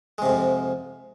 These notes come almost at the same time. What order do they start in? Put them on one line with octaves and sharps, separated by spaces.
G#3 C3 G#2 F2